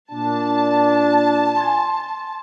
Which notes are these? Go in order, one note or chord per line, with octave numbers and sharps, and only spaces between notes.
A#2 D4 A5
G#5 C6